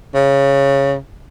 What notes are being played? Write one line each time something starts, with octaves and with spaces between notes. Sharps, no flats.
C#3